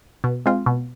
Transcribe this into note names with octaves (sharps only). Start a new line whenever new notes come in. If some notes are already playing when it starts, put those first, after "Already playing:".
B2
G#3 C4 F4
B2